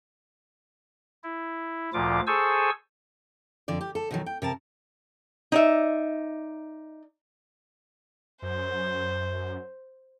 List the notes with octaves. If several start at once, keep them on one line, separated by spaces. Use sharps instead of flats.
E4
D2 A#2 F3 F4 D6
G#4 A4 C5 G#5 C#6 E6
F2 D3 D5
G4
A4
B2 D#3 F#3
G5
C3 A#4 A5
D#4 D5 E5
F#2 C5